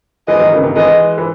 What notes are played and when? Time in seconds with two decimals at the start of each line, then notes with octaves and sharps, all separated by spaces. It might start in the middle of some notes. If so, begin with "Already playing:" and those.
0.28 E3 G#3 D#5
0.40 D#3 F#3
0.52 C#3 E3
0.64 C3 D#3
0.76 E3 G#3 D#5
1.18 E3